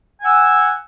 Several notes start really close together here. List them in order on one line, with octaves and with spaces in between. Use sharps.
G#5 F#5 E6